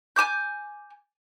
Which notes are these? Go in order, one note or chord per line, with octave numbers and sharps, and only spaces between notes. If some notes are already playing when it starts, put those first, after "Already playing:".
G#5 A5 D6 G6